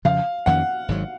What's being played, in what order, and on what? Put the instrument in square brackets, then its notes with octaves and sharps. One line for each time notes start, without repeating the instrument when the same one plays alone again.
[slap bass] F2 C#3 F3 [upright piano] F5
[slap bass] F2 D#3 A#3 C#4 [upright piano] F#5
[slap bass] G#1 G#2 F#3